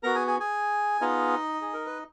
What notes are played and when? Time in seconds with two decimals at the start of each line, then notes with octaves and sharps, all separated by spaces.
0.03 B3 F#4 A#4 A#5
0.15 G#4 G#5
0.27 G#4 G#5
0.40 G#4 G#5
1.01 B3 D#4 F4 G#4 D#5
1.61 G#4
1.74 A#4
1.86 B4